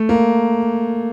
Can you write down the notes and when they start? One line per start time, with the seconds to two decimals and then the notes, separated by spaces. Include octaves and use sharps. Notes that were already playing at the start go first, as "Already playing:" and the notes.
Already playing: A3
0.09 A#3